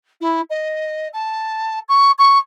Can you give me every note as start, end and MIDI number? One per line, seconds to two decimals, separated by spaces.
0.21 0.41 64
0.50 1.08 75
1.13 1.79 81
1.88 2.11 85
2.18 2.38 85